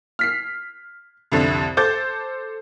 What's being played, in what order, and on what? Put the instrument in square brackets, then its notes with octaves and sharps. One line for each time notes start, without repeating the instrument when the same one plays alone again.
[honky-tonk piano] F6 B6 C7
C2 F2 D3
A4 C5 D6 G6 A6